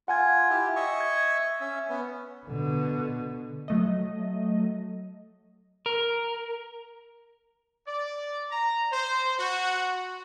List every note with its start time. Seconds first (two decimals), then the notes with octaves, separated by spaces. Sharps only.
0.08 F4 F#5 G#5 G#6
0.50 E4 G4
0.76 D#5 E5 C#6
1.01 G#6
1.61 C#4 E5
1.89 B3 C#4
2.47 B2 D3
3.68 F#3 A3 D#5
5.86 A#4
7.86 D5
8.49 A#5
8.91 C5
9.38 F#4